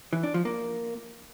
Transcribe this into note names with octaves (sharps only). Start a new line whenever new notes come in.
E3
D4
F3
A#3